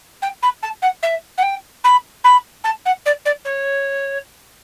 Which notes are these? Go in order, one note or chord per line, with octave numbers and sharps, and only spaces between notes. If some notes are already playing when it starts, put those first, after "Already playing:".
G5
B5
A5
F#5
E5
F#5
G5
B5
B5
A5
F#5
D5
D5
C#5